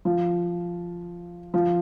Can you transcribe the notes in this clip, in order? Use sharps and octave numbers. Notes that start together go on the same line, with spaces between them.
F3
F3